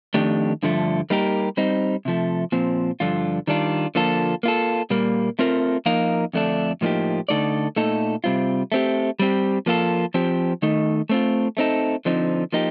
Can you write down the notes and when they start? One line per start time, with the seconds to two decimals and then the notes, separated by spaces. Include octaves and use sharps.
0.14 F2 D#3 A3 D4 G4
0.63 G2 D3 F3 A3
1.10 G3 A#3 D#4 G4 A#4
1.57 G3 C4 D#4
2.05 C3 F3 A3
2.52 A#2 F3 C4
3.00 G2 D3 F3 F4
3.47 D#3 G3 D4 F4
3.95 D3 F3 A#3 F4 A4
4.43 A#3 F4 A4
4.90 A#2 G3 A#3
5.39 A3 C4 F4 A#4
5.86 F3 A#3 D#4 A#4 F5
6.34 F2 D3 A3 D4
6.81 A2 F3 A#3 D#4 G4
7.29 D3 A3 D#4 A4 D5
7.76 A#2 A3 D#4 A4
8.24 C3 G3 C4 F4
8.72 A3 C4 G4
9.20 G3 C4 G4
9.66 F3 A#3 F4 A4
10.14 F3 C4 G4
10.62 D#3 A3 D#4
11.09 A3 C4 F4
11.57 A3 C4 D#4 A4
12.05 D3 F3 C4 D#4
12.53 F3 A#3 D#4 G4